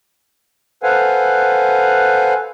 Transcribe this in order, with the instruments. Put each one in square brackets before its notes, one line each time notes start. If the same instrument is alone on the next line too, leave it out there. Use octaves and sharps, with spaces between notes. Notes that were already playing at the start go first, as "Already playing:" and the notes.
[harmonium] A4 B4 C5 F5 F#5 G#5